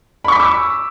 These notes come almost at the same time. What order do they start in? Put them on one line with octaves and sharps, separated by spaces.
B5 C#6 B6 D6 E6